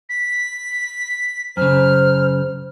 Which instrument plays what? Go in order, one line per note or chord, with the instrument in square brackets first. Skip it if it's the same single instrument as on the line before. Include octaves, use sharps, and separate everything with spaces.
[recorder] B6
[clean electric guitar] F#2 C#3 [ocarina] C5 [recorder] F6